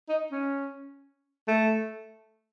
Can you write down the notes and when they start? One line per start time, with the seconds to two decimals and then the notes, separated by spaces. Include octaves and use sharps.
0.09 D#4
0.32 C#4
1.48 A3